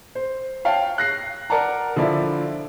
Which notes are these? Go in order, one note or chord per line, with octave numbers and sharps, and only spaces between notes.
C5
C#5 F5 G5 A5
F#6 A#6 C7
A#4 D5 F#5 A5 A#5
D3 F3 E4 D5 E5 B5